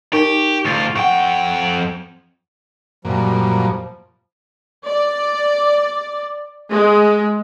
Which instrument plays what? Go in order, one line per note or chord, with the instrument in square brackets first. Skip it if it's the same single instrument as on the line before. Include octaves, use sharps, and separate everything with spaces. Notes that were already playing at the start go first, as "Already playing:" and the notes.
[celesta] D#4 A#4 C#6 [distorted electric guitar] G4
[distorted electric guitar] D2 F4 [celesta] C#6 A6 C7
[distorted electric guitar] F2 G5 [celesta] F#5 C#6
[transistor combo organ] F#2 A#2 [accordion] F3 G3
[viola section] D5
G#3